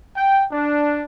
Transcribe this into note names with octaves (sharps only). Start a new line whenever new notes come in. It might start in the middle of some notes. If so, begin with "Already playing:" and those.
G5
D4